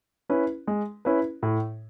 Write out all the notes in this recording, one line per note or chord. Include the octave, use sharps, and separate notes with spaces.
C#4 E4 B4
G#3
C#4 E4 B4
A2